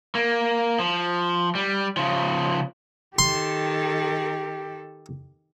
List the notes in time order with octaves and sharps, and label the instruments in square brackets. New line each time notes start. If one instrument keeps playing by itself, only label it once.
[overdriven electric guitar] A#3
F3
G3
C#3 F3
[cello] D#3 A4 [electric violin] G4 [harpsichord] C6